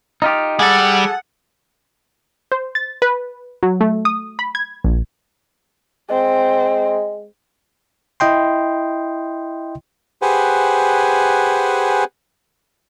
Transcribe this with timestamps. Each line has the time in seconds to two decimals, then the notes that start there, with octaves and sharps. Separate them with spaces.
0.22 D#4 F4 G4
0.59 G3 G#4 A4 F#5
2.52 C5
2.75 A6
3.02 B4
3.63 F#3
3.81 A3
4.05 D#6
4.39 B5
4.55 G#6
4.84 A#1
6.10 G#3 C4
8.20 E4 D#5 G5 C6
10.22 G4 G#4 B4 C5 F#5 G#5